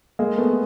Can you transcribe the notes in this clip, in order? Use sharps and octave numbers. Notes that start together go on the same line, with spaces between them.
G#3 A#3
A3 B3